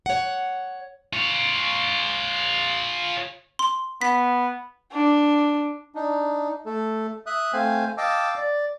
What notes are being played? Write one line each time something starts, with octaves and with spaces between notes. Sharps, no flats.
C#5 F#5
F4 C#5
C6
B3 B6
D4
D4 D#4
A3 A4
E5 D#6 F#6
A3 C4 C5 F5 G#5
D#5 F5 G5 A5 D6 E6
D5